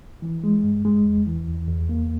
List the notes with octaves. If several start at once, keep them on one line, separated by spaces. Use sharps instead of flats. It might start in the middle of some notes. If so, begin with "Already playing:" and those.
E3
G#3
G2
G#3
E2
E3
E2
E2
A#3